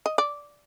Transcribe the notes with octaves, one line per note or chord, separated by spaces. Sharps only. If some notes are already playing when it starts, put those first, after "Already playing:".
D#5
D5